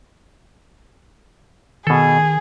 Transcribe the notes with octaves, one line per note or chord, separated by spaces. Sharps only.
B2 D#3 G#4 A4